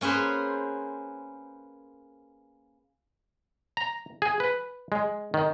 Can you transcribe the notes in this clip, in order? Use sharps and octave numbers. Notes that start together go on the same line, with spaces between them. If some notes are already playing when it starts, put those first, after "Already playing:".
A#3 C#4 G#4 B4 C5
A#5
G#4
B4
G#3
D#3